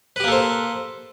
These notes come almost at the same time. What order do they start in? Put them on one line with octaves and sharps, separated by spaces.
B4 G4 A#3 A4 C5